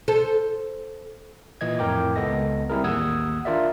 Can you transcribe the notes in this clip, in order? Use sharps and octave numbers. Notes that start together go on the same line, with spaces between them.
A4 C5
A#2 E3 D#5 G#6
F2 A2 A#4 G5 D6
C#2 B3 A4 D#5 A#6
G3 C4 E4 G#4 A#4
A1 D#2 F#5 D#6 E6 G#6
D4 F4 A#4 D5 E5